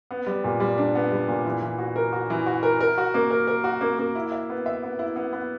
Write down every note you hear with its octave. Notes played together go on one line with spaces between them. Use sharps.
B3
G3
A#2
G3
D4
B3
G3
A#2
E3
E3
F#4
A#4
F#4
E3
F#4
A#4
A#4
F#4
A#3
A#4
A#4
F#4
A#3
A#3
E4
E5
B3
E5
B3
E4
B3
B3